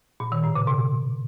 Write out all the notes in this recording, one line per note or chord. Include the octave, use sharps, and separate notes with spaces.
A#2
D#3
A2
C#3
B2